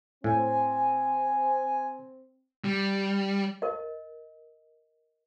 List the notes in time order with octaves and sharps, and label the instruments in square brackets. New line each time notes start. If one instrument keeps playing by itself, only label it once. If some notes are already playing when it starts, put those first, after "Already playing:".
[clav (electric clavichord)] A2 [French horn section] C4 [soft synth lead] G#5
[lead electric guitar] G3
[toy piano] A#4 D#5